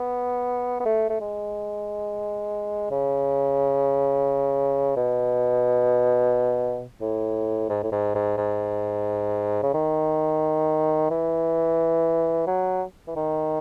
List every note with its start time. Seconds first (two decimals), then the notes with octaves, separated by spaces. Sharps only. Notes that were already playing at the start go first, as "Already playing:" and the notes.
Already playing: B3
0.81 B3
0.86 A3
1.10 A3
1.21 G#3
2.91 C#3
4.96 B2
7.01 A2
7.69 G#2
7.83 A2
7.92 G#2
8.15 G#2
8.37 G#2
9.63 C#3
9.74 D#3
11.11 E3
12.47 F#3
13.07 E3
13.16 D#3